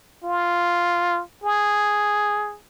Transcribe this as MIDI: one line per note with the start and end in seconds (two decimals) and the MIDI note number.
0.24 1.22 65
1.44 2.56 68